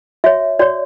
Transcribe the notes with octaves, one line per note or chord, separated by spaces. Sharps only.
F#4 C#5 E5
F#4 C#5 D5